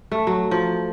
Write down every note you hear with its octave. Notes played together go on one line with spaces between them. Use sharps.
A3
F#3
F3